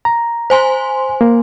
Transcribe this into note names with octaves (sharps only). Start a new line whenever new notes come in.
A#5
C5 G#5 C6
A#3